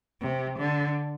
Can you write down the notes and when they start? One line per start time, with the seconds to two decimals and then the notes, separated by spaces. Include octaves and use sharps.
0.21 C3
0.59 D3